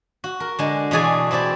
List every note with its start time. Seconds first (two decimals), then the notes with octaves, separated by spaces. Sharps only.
0.24 F#4
0.40 A#4
0.59 D3 G#3
0.91 B2 E3 A3 G#4 D5 G#5
1.31 C4 E4 G4 D5